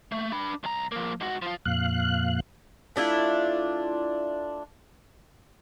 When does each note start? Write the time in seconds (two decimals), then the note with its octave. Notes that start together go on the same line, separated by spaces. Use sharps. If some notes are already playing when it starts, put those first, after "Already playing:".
0.12 A3
0.32 D4 B5
0.64 C2 A#5
0.92 F3 A#3
1.21 G#2 F#4
1.42 F3 F4
1.66 F2 A#2 F5 F#6
2.96 A3 D4 E4 F4